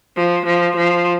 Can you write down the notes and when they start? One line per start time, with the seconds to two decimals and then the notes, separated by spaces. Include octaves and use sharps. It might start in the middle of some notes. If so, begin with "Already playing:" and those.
0.16 F3
0.46 F3
0.76 F3